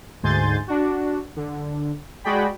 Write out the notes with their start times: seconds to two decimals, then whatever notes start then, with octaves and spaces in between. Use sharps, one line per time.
0.23 D2 G#2 G#5 C6 G6 A6
0.67 D4 F#4
1.36 D3
2.24 G#3 F#4 G#4 D5 G5 B5